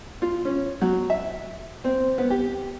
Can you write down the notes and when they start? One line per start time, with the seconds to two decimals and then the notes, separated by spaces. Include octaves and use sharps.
0.22 F4
0.45 C#4
0.81 F#3
1.10 E5
1.84 C4
2.18 B3
2.30 G4